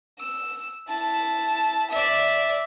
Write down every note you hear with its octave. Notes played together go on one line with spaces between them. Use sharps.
E6
E4 A5
D5 E5